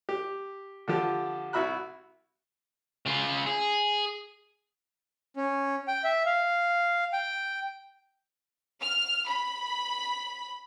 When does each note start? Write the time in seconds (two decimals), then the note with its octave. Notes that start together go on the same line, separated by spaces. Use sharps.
0.09 G4
0.88 D3 F3 G4
1.53 C2 F#4 E5 B5 F#6
3.06 C#3 F4
3.47 G#4
5.36 C#4
5.88 G5
6.04 E5
6.26 F5
7.13 G5
8.81 F6
9.28 B5